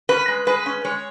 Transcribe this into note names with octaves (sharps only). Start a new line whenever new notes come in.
C#4 B4
G#3
G#3 B4
C#4
G#3 C#5